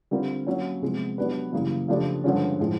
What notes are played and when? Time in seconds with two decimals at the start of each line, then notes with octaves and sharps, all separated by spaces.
0.11 D3 G3 C4 F4 A#4
0.47 F#3 A#3 C#4
0.82 C3 F3 G#3 B3
1.18 F#3 B3 D4 G4 B4
1.53 F#2 C#3 E3 G3 A#3
1.88 C#3 F3 A3 D4 G4
2.24 G2 D3 F3 G#3 C#4
2.60 A2 F3 G#3